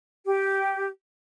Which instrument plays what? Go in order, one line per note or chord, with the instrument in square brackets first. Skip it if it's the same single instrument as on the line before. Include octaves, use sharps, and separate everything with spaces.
[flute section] G4